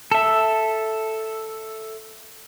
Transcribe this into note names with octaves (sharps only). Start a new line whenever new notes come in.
A4 E5